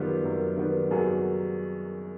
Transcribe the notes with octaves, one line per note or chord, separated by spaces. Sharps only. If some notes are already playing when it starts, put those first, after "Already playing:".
Already playing: F#2 D#3 G3 B3 F4 G4
F#2
D#3 G3 B3
F#2 F#4 G#4